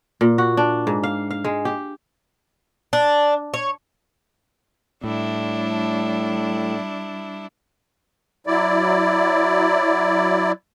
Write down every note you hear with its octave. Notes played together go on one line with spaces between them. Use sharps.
A#2
F#4
D4
G#2
F5
F5
G#3
G4
D4
C#5
A2 G3 D4 E4
F#3 E4 D5